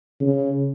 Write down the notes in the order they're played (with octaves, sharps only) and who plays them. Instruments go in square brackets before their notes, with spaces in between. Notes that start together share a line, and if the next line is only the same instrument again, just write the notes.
[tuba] C#3